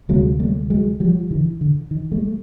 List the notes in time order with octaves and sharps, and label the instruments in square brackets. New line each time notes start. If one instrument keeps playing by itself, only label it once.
[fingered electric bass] D2 C3 F#3 G#3
G3 A3
F#3 G#3
F3 G3
D3 E3
D3
D#3
G3 A3
A3